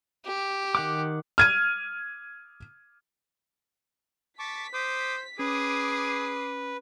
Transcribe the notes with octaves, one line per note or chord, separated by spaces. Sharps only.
G4
D#3 F#5 D6
F6 G#6 D#7
A5 C#6 D6 B6
C5 D6 D#6
C#4 G#4 B4 D6 D#6 C7